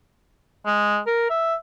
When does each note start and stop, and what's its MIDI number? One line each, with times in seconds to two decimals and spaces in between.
0.66 0.98 56
1.07 1.26 70
1.30 1.55 76